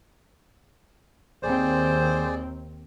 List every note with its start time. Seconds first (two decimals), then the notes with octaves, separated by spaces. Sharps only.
1.43 D#2 C4 G#4 C5 D5